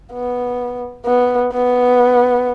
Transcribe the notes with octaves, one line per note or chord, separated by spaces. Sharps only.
B3
B3
B3